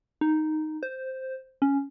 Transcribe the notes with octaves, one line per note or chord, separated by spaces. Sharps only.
D#4
C5
C#4